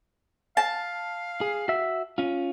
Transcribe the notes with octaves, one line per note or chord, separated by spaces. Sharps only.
F5 A5
G#4
F#4 E5
C#4 F4